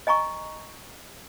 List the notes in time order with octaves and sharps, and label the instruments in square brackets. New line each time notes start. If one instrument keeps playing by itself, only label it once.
[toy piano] D#5 G#5 A#5 C#6